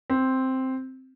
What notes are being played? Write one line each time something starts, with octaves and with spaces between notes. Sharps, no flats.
C4